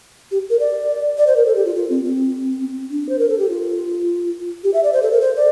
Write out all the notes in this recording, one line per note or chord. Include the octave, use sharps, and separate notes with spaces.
G4
A#4
D5
D5
C5
A#4
A4
G4
F4
F4
C4
C4
D4
C5
A#4
A4
G4
F4
G4
E5
D5
C5
A4
A#4
C5
D5